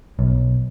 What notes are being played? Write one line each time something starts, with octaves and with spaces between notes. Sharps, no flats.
B1